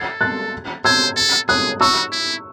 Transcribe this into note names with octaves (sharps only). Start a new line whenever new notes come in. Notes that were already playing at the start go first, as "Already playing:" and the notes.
Already playing: A4 G#6 C7
F#6 A6
C5 E6 G#6
A4
G#4 D#6 F#6
F#4 C#6 E6
E4